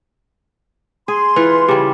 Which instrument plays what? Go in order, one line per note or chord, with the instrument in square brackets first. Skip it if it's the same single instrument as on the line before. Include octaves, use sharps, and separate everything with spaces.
[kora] G#4 [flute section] C6
[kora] E3 F4 [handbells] B4
[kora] C#3 G3 [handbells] G4